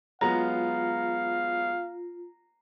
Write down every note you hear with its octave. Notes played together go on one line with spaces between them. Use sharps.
F#3 G#3 B3 F4 F5 A#5